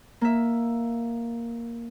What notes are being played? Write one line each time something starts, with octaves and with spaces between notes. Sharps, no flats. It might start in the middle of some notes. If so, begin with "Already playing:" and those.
A#3 E5